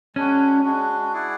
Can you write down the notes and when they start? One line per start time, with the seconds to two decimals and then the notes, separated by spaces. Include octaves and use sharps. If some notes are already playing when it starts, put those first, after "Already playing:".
0.15 G#3 C#4 D4 F#4
0.65 G#3 D4 F#4
1.13 E4 G#4 D5 F#5